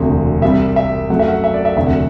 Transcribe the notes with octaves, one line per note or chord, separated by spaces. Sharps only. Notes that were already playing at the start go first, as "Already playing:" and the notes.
Already playing: E1 D2 C3
C2 C3 G3 E5
E5
F#2 F#3 A3 F#5
E5
F#5
E5
D5
E5
E1 D2 C3 E5
F#5